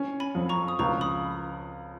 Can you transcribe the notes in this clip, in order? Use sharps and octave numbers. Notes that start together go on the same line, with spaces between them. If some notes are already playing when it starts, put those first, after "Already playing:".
Already playing: C#4
G#5 B5
F2
A#5 C#6
D#6
C#2 A#5 C#6
B5 D#6